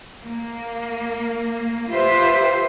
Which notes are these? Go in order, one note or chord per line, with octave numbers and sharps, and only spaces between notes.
A#3
F4 G4 B4 C5 E5